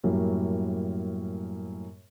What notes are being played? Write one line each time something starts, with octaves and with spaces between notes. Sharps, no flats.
F#2 A2 F#3 G3 A#3